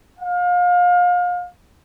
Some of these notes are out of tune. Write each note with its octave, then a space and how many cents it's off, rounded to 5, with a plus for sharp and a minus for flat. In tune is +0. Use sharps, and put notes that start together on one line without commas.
F5 +30